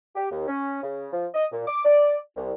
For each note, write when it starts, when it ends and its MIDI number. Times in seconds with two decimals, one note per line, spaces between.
0.16 0.27 67
0.31 0.46 39
0.48 0.81 61
0.83 1.07 49
1.13 1.27 53
1.34 1.46 75
1.52 1.63 46
1.67 1.83 86
1.85 2.17 74
2.37 2.53 36